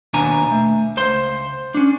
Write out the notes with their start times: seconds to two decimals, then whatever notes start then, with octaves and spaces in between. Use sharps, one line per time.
0.13 D#2 B2 B3 D4 G#5 A#5
0.51 A3
0.97 C#2 C5 C6
1.75 C#4 D4